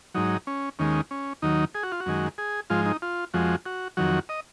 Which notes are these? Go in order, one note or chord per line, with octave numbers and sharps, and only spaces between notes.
G#2 F#3 D#4
C#4
D#2 D#3 G#3 C#4
C#4
D#2 D#3 F#3 D#4
G#4
F#4
F4
F#4
F#2 D#3 G#3
G#4
G#2 F3 G#3 F4
D#4
F4
F2 F3 G#3 F#4
F#4
F2 D#3 F#3 F#4
D#5